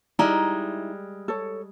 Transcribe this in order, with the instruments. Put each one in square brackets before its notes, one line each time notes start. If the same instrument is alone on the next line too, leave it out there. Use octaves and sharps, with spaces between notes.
[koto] G3 G#3 [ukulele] D#4 E4 A#5
[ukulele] A4 C#5